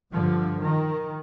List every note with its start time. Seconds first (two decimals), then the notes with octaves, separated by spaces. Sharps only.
0.12 G2 D3 F3
0.62 D#3